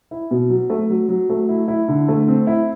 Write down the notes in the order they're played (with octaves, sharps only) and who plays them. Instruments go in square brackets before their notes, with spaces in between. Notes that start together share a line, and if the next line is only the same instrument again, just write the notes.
[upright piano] E4
B2
F#3
A3
F#3
F#3
A3
E4
E4
D3
A3
C4
E4